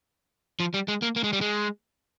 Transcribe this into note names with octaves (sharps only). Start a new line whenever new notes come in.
F3
G3
G#3
A#3
A#3
G#3
G3
G#3